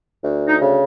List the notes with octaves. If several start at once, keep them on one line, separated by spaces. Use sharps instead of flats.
D2
D#4
C#3